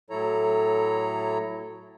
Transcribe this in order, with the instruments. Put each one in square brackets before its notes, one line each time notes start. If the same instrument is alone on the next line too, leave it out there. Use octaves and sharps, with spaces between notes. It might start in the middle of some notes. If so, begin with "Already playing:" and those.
[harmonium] A2 F#3 E4 A4 C#5 A#5